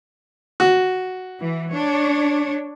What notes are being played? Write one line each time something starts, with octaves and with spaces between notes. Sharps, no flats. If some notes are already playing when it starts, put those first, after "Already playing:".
F#4
E3
D4 C#5